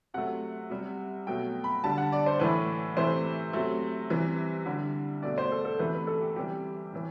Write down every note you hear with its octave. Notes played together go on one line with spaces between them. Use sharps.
C3 F#3 A3 F#5
C3 G3
B2 F#3 A3 G5
B5
D3 G3 A5
F#5
D5
C5
A2 E3 A3 B4
C3 E3 A3 C5
C3 F#3 A3
C3 E3 G3
D3 G3
B2 A3 D5
C5
A4
A4
C3 E3 A3 B4
B4
A4
G4
C3 E3 G3 G4
A2 E3